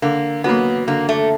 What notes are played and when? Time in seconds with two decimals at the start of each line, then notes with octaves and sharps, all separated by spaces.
0.02 D3 A#3
0.44 F#3 A#3 B3
0.87 D3 A#3
1.09 A3